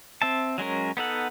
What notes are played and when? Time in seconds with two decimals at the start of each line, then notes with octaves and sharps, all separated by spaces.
0.22 C4 E5 A5
0.58 F#3 G#3 C#4 A#4
0.97 B3 D#4 A4 F#5